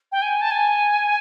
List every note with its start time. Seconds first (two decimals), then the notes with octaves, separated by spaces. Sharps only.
0.12 G5
0.22 G#5
0.41 A5
0.51 G#5